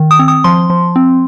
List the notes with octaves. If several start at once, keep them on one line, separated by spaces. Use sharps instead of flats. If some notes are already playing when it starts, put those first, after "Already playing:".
Already playing: D#3
D#6
C4
D#6
F3 C6
F3
C4